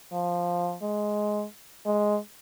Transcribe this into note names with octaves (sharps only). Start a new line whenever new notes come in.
F3
G#3
G#3